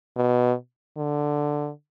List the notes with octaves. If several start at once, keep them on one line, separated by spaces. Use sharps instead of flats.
B2
D3